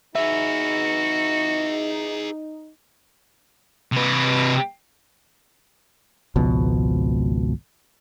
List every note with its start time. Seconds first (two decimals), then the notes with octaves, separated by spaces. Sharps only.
0.15 D#4 F#4 G#4 B4 E5
3.92 C3 B4
6.36 G#1 C#2 B2 F3